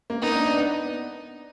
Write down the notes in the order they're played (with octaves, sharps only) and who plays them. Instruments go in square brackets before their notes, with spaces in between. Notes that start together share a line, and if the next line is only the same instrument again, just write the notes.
[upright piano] A#3
[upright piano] B3 [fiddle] D#4
[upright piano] D4
D4
B3